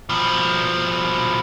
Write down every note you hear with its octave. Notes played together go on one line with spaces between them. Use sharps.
B2 F3